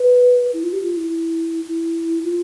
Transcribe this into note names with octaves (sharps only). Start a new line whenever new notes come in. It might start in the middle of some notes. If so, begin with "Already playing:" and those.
Already playing: B4
E4
F4
G4
F4
E4
E4
F4